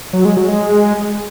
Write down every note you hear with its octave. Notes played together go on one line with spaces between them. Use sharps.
F#3
G#3
F#3
G#3